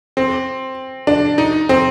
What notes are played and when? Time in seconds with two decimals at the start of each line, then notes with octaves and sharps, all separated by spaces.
0.17 C4
1.07 D4
1.38 D#4
1.69 C4